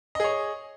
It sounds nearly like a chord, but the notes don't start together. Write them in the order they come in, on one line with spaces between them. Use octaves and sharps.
D#5 G#4 C#5